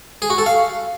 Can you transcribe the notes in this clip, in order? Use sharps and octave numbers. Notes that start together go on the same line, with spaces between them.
G#4
F#4
A4
F5